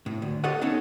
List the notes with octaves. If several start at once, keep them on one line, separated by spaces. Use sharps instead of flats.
A2
D2
F4 G4 A4 C#5 D#5 F#5
B3 C#4 D#4 A4 C#5